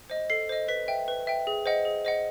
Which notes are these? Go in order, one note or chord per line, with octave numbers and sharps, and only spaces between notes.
C5 D#5
A4 C7
C5 D#5
B4 B6
E5 G5
B4
E5 G5
G#4
C5 D#5 F#5
G#4
C5 D#5 F#5